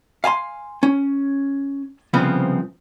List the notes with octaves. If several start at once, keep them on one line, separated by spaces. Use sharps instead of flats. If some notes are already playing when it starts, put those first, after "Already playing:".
F5 G#5 A5 C6
C#4
C2 C#3 F3 B3 C4 B5